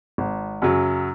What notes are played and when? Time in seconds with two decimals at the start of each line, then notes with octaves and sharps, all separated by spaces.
0.18 G#1
0.62 F#2 C#3 F#3